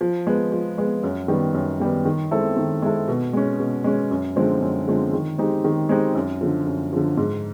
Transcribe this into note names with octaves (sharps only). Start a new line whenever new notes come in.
F3
G#3 B3
F3
G#3 B3
F#2
D#3 G3 B3
F#2
D#3 G3 B3
D#3
G#3 C4 E4 A4
D#3
G#3 C4 E4 A4
B2
G#3 C#4
B2
G#3 C#4
F#2
D3 F3 G#3 C4
F#2
D3 F3 G#3 C4
D#3
G#3 C4 D#4 G4
D#3
G#3 C4 D#4 G4
F#2
D3 F3
F#2
D3 F3
G#2